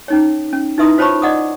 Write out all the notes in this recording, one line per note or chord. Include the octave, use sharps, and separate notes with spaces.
C#4 D#4 C#5
C#4
D#4 E4 B4 E5 C6 D#6
F4 C5 C#5 A5 B5 C#6
D5 D#5 F#5 D6 D#6